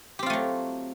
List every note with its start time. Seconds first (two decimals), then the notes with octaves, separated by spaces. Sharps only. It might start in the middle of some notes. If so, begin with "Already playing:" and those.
0.19 G4
0.23 C4
0.26 F4
0.30 A3
0.33 F#3